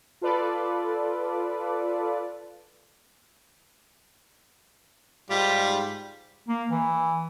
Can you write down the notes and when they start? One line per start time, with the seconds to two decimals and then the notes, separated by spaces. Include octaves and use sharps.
0.21 F4 A4 B4 D5
5.30 G#2 G3 F4 G4 B6
6.48 A#3
6.71 E3